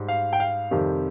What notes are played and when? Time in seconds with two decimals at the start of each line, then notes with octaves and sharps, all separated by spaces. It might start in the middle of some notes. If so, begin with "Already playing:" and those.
Already playing: G#2 G3
0.08 F5
0.33 G5
0.40 F5
0.71 F2 C3 D#3 G3